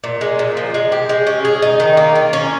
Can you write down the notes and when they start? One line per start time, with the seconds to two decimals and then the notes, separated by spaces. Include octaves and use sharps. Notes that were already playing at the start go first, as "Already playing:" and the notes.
0.04 A#2
0.21 G#3
0.39 A#2
0.57 F3
0.74 G#3
0.92 G4
1.09 G#3
1.27 C#4
1.45 G#4
1.62 D#4
1.80 D#3
1.97 A#3
2.15 F4
2.33 C#4